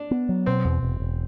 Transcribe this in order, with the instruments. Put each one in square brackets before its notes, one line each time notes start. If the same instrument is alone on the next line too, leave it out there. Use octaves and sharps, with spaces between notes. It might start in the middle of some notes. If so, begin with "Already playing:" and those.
Already playing: [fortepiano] D4
[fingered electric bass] B3
F#3
[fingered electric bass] B2 [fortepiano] C4
[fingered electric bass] E2
E1
E1